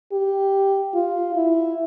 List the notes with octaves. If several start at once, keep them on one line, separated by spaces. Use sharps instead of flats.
G4
F4
E4